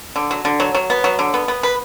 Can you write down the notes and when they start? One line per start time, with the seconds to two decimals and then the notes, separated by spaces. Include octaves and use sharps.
0.16 D3
0.31 F#3
0.45 D3
0.60 F#3
0.75 F#3
0.90 B3
1.04 F#3
1.19 D3
1.34 B3
1.48 B3
1.63 B4